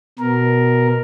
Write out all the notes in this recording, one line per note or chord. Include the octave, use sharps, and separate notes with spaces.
B2 A#4